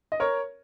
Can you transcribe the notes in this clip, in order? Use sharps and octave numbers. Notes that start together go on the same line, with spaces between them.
D#5
A#4 C#5